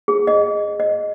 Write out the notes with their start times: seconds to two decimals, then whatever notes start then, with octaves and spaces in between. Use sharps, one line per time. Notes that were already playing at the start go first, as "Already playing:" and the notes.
0.08 G#4
0.27 D#5
0.80 D#5